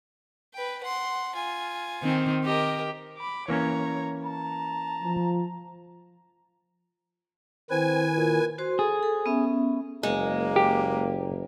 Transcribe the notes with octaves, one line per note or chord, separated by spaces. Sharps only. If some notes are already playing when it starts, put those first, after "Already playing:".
B4 G5
F#5 C6
F4 G#5
D#3 C4
G4 A#4 D#5
B5 D6
E3 A#3 C#4 C#5 A#5
A5 A#5
F3
D#3 C4 E4 B4 G#5
A#2
F#4 C5 C6
G#4 A4
A4
B3 C#4 E5
F#1 G#3 A#3
G4